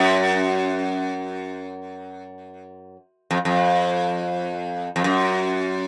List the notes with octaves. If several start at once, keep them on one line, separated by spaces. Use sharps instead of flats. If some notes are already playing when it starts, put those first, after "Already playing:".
Already playing: F#2
F2
F2
F2
F#2